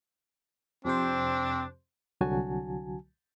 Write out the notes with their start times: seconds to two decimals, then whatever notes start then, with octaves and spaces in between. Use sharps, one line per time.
0.85 F2 C3 C4 D4 C5
2.21 C2 D3 F#3 F#4 G#5 A5